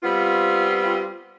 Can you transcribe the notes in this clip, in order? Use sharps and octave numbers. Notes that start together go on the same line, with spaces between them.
G3 B3 C4 F4